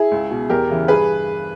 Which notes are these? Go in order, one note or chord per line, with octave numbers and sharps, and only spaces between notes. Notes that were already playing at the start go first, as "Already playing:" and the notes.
Already playing: E4 G#4
C#2
B2
E2 G4 A#4
C#3 E3
G2 G#4 B4